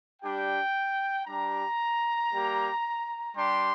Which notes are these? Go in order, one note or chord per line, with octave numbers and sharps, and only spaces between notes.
G3 D4 G4 G5
G3 D4 G4 A#5
G3 A#3 G4
G3 D4 G4 C6